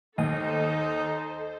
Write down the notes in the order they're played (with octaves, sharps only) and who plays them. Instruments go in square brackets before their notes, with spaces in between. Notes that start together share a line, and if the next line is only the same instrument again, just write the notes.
[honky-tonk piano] D#2 [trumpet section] D#4 [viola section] A4 C5 [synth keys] D#5